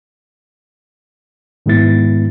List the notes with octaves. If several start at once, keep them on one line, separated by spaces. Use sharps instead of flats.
G#2 D#3 G#3 B3 E4 A6